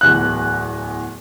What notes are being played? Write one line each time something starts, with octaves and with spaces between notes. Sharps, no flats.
D1 E2 F#6